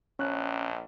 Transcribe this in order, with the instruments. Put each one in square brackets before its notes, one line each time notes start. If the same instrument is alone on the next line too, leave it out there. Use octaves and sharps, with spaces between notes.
[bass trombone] A#1 [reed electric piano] C#4 F#6